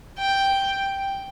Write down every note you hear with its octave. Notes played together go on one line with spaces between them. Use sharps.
G5